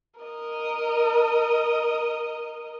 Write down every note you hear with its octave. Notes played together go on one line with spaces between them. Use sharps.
A#4 D#5